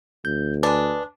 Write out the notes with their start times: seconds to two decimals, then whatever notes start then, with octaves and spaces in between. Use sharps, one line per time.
0.25 D2 G6
0.63 G#3 D4 B4